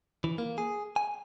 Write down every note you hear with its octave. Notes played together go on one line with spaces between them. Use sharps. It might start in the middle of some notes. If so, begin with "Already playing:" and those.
E3
A#3
G#4
G#5